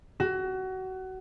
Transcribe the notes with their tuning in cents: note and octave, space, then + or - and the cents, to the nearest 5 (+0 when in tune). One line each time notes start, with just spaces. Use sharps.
F#4 +25